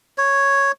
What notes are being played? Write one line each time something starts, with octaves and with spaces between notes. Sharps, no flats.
C#5